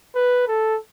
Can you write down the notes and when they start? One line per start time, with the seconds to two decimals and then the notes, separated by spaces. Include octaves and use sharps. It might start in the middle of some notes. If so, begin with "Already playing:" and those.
0.15 B4
0.48 A4